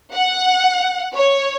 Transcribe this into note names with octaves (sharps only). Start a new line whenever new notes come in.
F#5
C#5